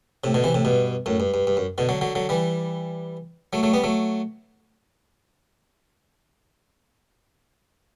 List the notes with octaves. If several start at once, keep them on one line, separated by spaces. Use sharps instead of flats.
A2 C3
B2 D3
C3 E3
A2 C3
G2 B2
F#2 A2
G2
G2
G2
F#2
B2 D3
D3 F#3
D3 F#3
D3 F#3
E3 G3
F#3 A3
F#3 A3
G3 B3
F#3 A3